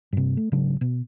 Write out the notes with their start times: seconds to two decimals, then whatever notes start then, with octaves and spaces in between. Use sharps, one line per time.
0.13 G2 C3
0.37 A3
0.52 G#1 C#3 F#3 D4
0.81 B2